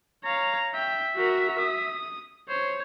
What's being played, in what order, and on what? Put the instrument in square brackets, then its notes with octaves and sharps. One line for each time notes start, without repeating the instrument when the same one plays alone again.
[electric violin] C#5 F5 [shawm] A#5
[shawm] E5 [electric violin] G5
[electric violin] F#4 A#4
D#6
[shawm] C5 [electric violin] C#5